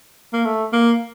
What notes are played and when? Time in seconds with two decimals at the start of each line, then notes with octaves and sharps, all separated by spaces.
0.33 A#3
0.45 A3
0.73 A#3